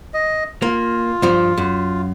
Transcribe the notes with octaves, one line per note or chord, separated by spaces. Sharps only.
D#5
A#3 F4
G2 F3
F#2